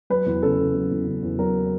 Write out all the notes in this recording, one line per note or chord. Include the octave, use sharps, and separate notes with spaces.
F#3 B4
E2
C#3 A4
E2
F#3
E2
C#3
E2
F#3 A#4